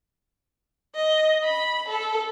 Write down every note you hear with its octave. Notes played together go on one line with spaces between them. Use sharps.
D#5
B5
A4